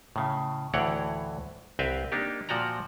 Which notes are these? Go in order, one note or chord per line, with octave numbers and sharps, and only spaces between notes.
A2 C#3
D2 A2 E3 C#5 F#5 G5
C2 C4 B4 E5 F5 G5
A#3 D4 D#4 G4
A#2 F3 F#4 D5 G5 A#5